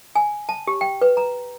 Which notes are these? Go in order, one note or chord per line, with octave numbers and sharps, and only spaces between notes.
G#5
A5
G4
G5
B4
A#5